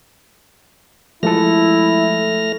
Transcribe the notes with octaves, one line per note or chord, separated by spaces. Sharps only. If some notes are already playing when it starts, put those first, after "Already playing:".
F3 G#3 A3 E4 A4 F6 A#6